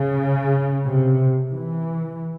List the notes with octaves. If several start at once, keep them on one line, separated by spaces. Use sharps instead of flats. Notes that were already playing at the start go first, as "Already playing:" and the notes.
Already playing: C#3
C3
E3